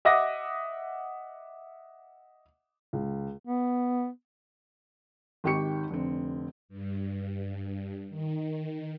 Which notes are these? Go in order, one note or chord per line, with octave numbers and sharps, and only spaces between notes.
D#5 E5 F#5 D6 D#6 A#6
C#2
B3
G#1 D#3 G4 G5 C#6 C#7
F1 D3 C4
G2
D#3